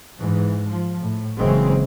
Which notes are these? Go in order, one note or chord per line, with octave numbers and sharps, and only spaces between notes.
G#2 E3
F3
A2
F#1 C#3 E3 G#3 C4